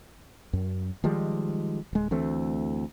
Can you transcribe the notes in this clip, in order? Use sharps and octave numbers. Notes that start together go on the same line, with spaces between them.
F#2
D#3 F3 G3 G#3
D1 G#3
D2 E3 A3 C4